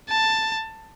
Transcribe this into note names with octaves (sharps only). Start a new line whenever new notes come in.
A5